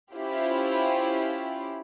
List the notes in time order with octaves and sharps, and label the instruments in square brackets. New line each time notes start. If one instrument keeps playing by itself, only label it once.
[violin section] C#4 E4 F4 G4 C5